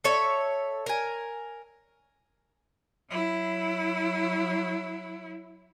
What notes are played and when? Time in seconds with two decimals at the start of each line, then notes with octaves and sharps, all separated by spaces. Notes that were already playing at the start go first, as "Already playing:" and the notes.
0.04 A4 C#5 E5
0.86 A#4 G#5
3.10 F#3 E4